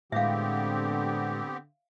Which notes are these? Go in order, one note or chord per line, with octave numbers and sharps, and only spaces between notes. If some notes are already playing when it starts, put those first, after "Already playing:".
A2 D3 G#3 B3 C4 G4 E5 F5